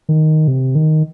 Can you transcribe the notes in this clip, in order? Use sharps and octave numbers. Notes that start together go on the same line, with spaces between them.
D#3
C3
D#3